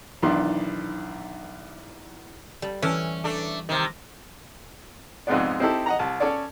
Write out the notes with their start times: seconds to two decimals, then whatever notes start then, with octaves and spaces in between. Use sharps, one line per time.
0.22 B1 E2 D#3 D4 C6
2.62 G3
2.82 E3 C#4
3.24 A3 D4
3.69 C3 D#3
5.27 F2 G#2 C3 G#3 B3 D5
5.60 C4 D#4 E4 G4 A4
5.86 D#5 F#5 A#5
5.99 C2 A5
6.20 C#4 A4 C#5 D5